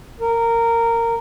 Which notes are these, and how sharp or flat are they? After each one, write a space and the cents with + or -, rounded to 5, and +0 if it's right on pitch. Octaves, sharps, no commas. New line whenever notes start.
A#4 -15